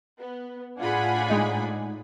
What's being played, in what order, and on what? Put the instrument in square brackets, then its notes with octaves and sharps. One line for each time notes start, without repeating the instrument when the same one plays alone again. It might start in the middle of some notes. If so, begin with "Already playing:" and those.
[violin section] B3
[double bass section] A2 [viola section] D4 F#5 G#5 [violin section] F4 G#4 B5
[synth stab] G#3 D#4